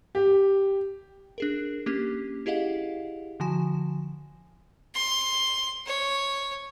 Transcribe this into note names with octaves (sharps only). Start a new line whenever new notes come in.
G4
D4 G#4 A#4
A#3 C#4 D4 G4
E4 G4 G#4 D#5 F5 F#5
D3 F3 F#4 G#5 E7
C6
C#5